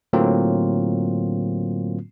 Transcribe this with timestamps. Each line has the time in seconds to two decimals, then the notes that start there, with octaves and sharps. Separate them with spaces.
0.13 A2 D3 F#3 A#3 C4 F4